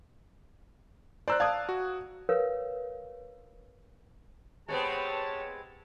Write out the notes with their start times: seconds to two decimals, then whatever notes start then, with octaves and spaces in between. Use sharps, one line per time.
1.28 C5 D5 A#5 E6 F#6
1.40 D5 F5 A5 D#6 F#6 G#6
1.69 F#4
2.29 A#4 B4 C#5 F5
4.68 G#3 B3 C4 G4 C#5 A5